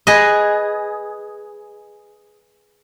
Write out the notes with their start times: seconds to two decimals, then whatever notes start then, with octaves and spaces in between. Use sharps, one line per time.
0.07 G#4 B4 D#5